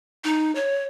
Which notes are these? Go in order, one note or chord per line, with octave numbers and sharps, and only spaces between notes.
D#4
C#5